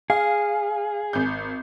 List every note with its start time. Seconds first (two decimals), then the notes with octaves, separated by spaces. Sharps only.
0.10 G#4 F5
1.13 G#1 G6